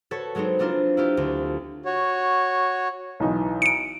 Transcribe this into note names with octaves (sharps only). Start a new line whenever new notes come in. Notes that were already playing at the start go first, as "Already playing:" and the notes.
F#4 A4 B4 C#5
F#3 G#3 B3 C4 D#4
B3 C4 D4 F4 A#4
E4 F4 G4
D2
F#4 C#5
B1 E3 D#4
C#7 D7